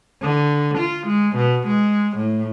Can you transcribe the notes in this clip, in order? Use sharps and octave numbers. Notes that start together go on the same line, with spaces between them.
D3
F4
G#3
B2
G#3
A2